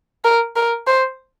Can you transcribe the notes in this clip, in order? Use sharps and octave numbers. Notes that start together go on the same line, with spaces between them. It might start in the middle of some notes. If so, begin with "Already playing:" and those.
A#4
A#4
C5